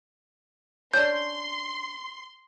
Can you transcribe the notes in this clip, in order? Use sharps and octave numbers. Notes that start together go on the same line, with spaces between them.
C#4 D4 C6 G6